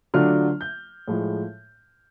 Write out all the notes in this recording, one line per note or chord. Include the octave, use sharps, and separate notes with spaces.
D3 F#3 A3 D4 F4 F6
G6
A2 F3 G#3